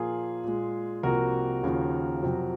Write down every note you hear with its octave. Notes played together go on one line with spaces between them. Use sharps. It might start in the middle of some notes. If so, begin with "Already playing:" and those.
Already playing: A#2 F3 A#3 F4 G#4
A#2 G#3
C2 C3 F3 A#3 F#4 A#4
D#2 C#3 F3
F2 C3 F#3